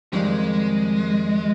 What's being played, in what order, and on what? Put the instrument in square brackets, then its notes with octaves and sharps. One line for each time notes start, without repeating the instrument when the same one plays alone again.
[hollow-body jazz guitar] F2 D#3 G3 [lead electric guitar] G#3